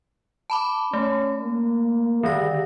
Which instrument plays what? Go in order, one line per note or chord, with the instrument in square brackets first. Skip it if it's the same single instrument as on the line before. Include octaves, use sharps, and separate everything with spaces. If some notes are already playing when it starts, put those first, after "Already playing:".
[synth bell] A5 B5 D6
[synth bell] A3 [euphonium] C#4
[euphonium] A#3
[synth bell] D3 D#3 A#6 [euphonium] G3